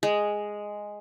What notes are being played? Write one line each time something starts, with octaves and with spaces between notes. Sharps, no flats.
G#3